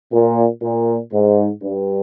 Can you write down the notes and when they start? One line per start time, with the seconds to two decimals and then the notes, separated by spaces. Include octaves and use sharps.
0.12 A#2
0.62 A#2
1.13 G#2
1.63 G2